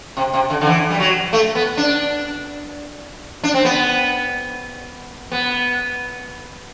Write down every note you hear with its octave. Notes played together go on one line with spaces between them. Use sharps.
C3
C3
D3
D3
E3
G3
F#3
A3
B3
D4
D4
C4
B3
B3